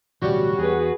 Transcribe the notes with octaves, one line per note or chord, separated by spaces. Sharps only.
D1 B2 E3 G3 C#4 F#4 G4
E2 G#4 B4